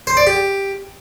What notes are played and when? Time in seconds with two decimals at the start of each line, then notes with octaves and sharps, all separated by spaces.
0.07 C5
0.17 D5
0.27 G4